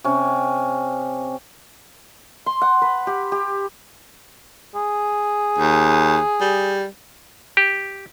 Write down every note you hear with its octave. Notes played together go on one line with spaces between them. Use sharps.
C3 C#4
C6
F#5
B4
G4
G4
G#4
D#2
G3
G4